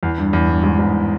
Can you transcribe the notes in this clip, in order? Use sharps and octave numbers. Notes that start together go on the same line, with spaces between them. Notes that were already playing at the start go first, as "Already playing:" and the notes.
E2
G2
E2
G2
E2 G#2
E2 G#2